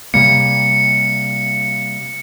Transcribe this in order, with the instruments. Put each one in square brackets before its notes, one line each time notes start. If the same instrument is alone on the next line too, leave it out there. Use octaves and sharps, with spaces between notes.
[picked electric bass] C3 G3 A#3 [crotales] C#7